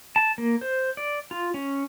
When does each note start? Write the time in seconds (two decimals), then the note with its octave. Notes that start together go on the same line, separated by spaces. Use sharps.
0.16 A5
0.38 A#3
0.61 C5
0.97 D5
1.31 F4
1.54 C#4